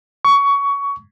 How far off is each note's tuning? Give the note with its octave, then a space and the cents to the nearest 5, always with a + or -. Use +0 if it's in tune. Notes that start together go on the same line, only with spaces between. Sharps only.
C#6 +20